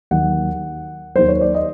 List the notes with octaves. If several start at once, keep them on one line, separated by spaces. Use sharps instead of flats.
D#2 D#3 F#3 F#5
D#2 D#3 F#3 C5
C#5
D5
D#5